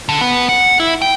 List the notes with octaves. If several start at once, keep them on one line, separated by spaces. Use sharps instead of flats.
D3
B3
F#5
E4
G5